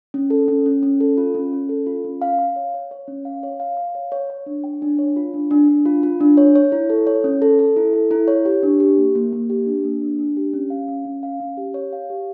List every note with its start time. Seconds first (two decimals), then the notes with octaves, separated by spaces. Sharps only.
0.14 C#4
0.30 A4
0.48 C#4
0.66 C#4
0.83 C#4
1.00 A4
1.18 F4
1.35 C#4
1.53 C#4
1.69 A4
1.86 F4
2.04 C#4
2.22 F5
2.39 F5
2.56 C#5
2.74 C#5
2.91 C#5
3.08 C#4
3.25 F5
3.43 C#5
3.60 F5
3.77 F5
3.95 C#5
4.12 C#5
4.30 C#5
4.46 D4
4.64 G5
4.82 D4
4.99 C#5
5.16 F4
5.34 D4
5.51 D4
5.68 D4
5.86 F4
6.03 F4
6.20 D4
6.37 C#5
6.56 C#5
6.72 E4
6.90 A4
7.07 C#5
7.24 C#4
7.42 A4
7.59 A4
7.76 E4
7.93 A4
8.11 E4
8.28 C#5
8.45 G4
8.63 D4
8.80 G4
8.98 A#3
9.15 A#3
9.33 A#3
9.50 G4
9.66 D4
9.85 A#3
10.02 D4
10.19 D4
10.37 G4
10.53 C#4
10.70 F5
10.88 C#4
11.05 C#4
11.23 F5
11.40 C#4
11.57 G4
11.74 C#5
11.93 F5
12.10 G4